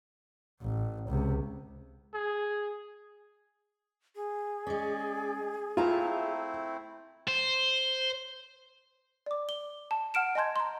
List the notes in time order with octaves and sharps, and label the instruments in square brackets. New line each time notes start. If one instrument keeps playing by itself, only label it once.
[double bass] A1
C#2 C3
[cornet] G#4
[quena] G#4
[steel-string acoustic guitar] G#3 C#4 [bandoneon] D5
[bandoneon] A3 C4 E4 [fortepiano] F4 [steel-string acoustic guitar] E5 A5 A#5
[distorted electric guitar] C5
[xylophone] D5 D6
G7
A5
F#5 F6 D7 E7
D#5 G#5 A5 C6 G6 G#6
A#5 C6